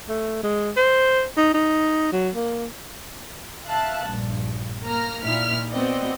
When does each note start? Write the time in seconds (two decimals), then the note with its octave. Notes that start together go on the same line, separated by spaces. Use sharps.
0.09 A3
0.44 G#3
0.77 C5
1.37 D#4
1.54 D#4
2.12 F#3
2.35 A#3
3.66 E5 F5 A5 F#6
4.08 A#1 G2
4.85 A#3 A#5 F6 A#6
5.23 A#2 D#4 E4 F6 B6
5.71 B3 C4 F#4 D5 D#5 G5